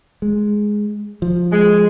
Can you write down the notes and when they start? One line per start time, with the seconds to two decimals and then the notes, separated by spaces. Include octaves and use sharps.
0.22 G#3
1.22 F3
1.52 G#3